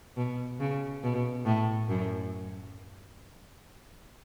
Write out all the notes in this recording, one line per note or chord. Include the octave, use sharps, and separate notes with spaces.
B2
C#3
B2
A2
F#2